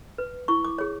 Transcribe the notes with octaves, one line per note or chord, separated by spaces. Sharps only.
B4
E4 C#6
D6
G#4 C#5